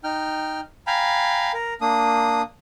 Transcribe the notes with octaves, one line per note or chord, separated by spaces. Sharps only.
D#4 G5 F6
F5 G5 G#5 A#5 B5
A#4
A#3 D4 D#6